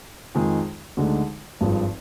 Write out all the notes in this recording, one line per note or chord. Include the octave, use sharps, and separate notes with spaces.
F2 D#3 G#3 D#4 G#4
D2 D3 G#3 D#4
G#1 G2 F3 G#3